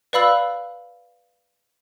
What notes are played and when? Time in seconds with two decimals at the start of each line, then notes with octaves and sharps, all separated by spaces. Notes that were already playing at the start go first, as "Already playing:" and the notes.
0.13 B4 D5 F5 B5 E6 F#7